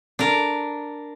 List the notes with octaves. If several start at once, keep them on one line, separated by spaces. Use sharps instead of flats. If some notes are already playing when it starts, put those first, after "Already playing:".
D4 A#4